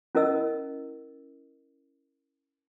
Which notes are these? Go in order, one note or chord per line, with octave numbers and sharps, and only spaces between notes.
C#4 E4 A#4 D#5 E6